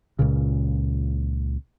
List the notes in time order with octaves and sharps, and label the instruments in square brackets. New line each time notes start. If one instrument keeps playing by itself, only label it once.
[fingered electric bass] C#2 A#2 C#3